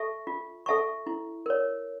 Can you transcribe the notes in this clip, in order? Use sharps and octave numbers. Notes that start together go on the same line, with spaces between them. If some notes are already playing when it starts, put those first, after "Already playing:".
Already playing: A4 E5 A5 C#6
F4
A4 E5 A5 C#6
E4
A#4 C#5